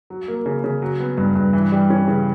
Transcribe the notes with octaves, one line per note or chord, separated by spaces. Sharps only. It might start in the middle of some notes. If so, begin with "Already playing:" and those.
F#3
A#3
C#3
C#3
F#3
B3
G2
G2
E3
G3
C#4
C#3